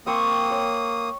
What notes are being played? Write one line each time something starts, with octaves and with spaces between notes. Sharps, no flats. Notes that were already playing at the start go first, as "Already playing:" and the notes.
A#3 C4 C5 C#6 D#6
C#5